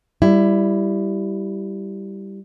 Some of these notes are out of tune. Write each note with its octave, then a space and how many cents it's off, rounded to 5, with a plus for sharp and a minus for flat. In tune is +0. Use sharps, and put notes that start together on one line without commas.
G3 +0 E4 +15